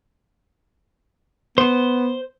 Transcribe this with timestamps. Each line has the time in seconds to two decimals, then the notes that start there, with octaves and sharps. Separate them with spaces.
1.58 B3 C5